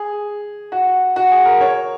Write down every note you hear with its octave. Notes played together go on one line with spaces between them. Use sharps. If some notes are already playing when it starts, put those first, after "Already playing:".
Already playing: G#4
F#4
F#4
G#4
A#4
C#5